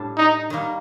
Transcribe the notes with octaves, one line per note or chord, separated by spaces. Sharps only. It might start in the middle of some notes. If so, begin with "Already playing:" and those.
Already playing: A2 G3 D4 A4
D#4
D#3 G3 A#3